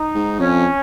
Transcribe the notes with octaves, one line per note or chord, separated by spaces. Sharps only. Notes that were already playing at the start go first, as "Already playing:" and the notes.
Already playing: D#4
G#2
F2 C#4